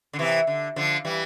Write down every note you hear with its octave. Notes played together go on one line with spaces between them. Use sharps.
D3
C3 E3
D3
D3 F3
E3 G3